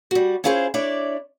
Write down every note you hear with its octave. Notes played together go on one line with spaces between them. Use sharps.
G3 F#4
C#4 E4 F4 G#4 A#4 C5
D4 E4 C#5 D5